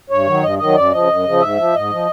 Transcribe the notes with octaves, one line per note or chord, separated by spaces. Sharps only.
G2 C#5
D#3 F#3
G2 D#5
D#3 F#3 D#5
F#2 D5
C#3 F3 D#5
F#2
C#3 F3
G#2 E5
F3
G#2 D#5
F3